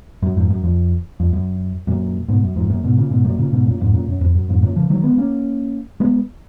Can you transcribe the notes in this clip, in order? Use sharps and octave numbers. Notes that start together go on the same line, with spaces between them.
F#2
F2 G#2
F#2
F2
F2
F#2
F#2 A#2
G#2 B2
F#2
F2 G#2
F#2 A#2
G#2 B2
A#2 C#3
G#2 B2
F#2 A#2
A#2 C#3
G#2 B2
F#2 A#2
F2 G#2
F#2 A#2
F#2
F2
F#2
F2 G#2
F#2 A#2
C#3 F3
D#3 F#3
G#3 B3
A#3 C#4
G#3 B3